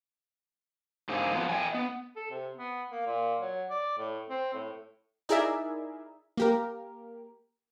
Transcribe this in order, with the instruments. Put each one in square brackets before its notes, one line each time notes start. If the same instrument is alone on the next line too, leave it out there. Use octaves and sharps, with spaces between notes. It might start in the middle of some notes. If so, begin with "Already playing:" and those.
[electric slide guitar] G#2 D3 A#3 C4 G#4
F3 F#3 B3
D#5 E5 G5 G#5
B3
[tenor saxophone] A4
C3
B3
A#3
A#2
F#3
D5
A2
C4
A2
[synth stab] D#4 E4 G#4 A#4 D5 E5
A#3 G4 A#4